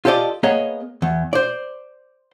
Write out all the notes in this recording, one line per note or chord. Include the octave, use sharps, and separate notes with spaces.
F4 G4 A4 C5 D5 D#5
A#3 B3 G#4 C#5 D#5
E2
C5 D5